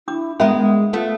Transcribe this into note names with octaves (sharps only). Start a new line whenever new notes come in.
D4 E4 D6
G#3 B3 C#4 A#4 E5 B5
A3 B3 F4 A4